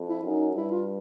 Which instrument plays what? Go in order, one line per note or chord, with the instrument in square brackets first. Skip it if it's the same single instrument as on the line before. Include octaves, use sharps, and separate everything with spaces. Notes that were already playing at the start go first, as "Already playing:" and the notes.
Already playing: [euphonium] F2
[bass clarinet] E4
[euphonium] F#2 [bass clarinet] D#4
[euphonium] G2 [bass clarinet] E4
[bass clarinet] F4